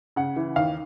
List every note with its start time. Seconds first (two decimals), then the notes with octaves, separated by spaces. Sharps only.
0.16 C#3 F#5
0.36 E3
0.56 D#2 F5